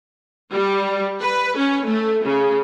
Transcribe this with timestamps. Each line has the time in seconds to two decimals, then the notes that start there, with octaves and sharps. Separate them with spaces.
0.51 G3
1.20 B4
1.57 C#4
1.86 A3
2.25 C#3